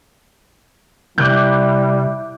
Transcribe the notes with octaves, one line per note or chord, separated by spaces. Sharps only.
C3 G3 E4 D6 F#6 G6